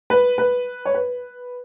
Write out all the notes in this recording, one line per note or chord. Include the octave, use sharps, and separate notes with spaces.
B4
B4
C#5
B4